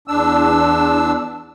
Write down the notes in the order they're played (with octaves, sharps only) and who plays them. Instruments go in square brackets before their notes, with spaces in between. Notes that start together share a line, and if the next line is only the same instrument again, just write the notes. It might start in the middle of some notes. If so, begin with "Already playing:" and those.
[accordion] E2 D4 E6